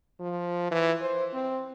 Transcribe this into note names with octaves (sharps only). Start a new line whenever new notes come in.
F3
E3
C5
C4